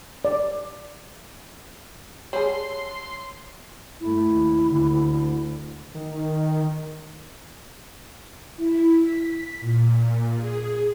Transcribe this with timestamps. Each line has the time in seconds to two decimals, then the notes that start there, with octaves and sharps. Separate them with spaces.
0.25 D5
2.33 G3 G#4 C#5 F#5 A5 C6
4.00 G2 A3 E4
4.31 D#2
4.67 D2 D3
5.95 D#3
8.56 E4
8.98 B6
9.60 A#2
10.35 G#4